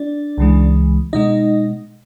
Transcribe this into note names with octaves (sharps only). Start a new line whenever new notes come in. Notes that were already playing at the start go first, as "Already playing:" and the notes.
Already playing: D4 D5
C#2 C#3 E3 G#3
B2 G#3 D#4 D#5